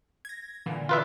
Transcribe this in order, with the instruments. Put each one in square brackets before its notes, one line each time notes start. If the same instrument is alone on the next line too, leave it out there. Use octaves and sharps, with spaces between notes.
[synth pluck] G#6 A#6
A#2 D3 E3
[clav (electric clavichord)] F4 B4 E5